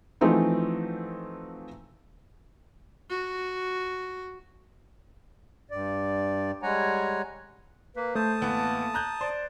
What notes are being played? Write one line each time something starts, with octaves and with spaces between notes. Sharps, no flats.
E3 F3 A3 C4 D#4 F#4
F#4
G2 D5
G3 G#3 C#5 F#5 G#5 A#5
A#3 B4
A3 C5 A5 D#6
A1 A#3 B3
A#5 F#6 G6
C5 D5